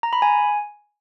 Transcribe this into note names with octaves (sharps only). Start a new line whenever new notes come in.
A#5
B5
G#5